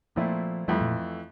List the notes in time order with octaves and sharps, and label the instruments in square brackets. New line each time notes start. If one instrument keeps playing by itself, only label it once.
[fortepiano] A#2 A3 C4 E4 [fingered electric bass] F3
[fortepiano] F2 E3 A3 E4 [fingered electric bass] G3
[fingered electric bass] A#2